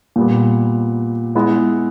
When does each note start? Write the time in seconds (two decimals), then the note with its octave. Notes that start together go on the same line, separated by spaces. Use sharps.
0.16 A#2 G3 B3
1.35 G#3 B3 E4